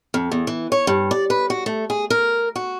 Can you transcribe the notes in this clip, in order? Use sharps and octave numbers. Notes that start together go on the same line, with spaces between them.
F2
E2
E3
C#5
G2
D5
B4
F#4
A3
G#4
A#4
F#4